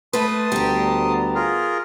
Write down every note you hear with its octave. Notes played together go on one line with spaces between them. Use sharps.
A3 B4 A5 C6 D#6
D2 G3 B3 G4 A#5
F4 G#4 A#4